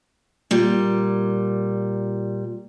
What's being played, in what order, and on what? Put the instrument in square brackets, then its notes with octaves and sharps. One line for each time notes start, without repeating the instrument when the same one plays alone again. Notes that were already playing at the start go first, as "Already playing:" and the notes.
[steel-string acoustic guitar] A#2 G3